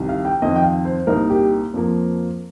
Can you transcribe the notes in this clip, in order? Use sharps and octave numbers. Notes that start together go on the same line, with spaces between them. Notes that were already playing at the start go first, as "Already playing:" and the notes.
Already playing: C2 C3 D#3
F5
G5
F2 D#3 C4 D#5
G5
F5
C5
C2 A#2 A#3 D#4 A#4
G4
F2 F3 A#3